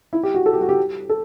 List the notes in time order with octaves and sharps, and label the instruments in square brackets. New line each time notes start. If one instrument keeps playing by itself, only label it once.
[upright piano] E4
G4
F#4
A4
G4
F#4
G4
A4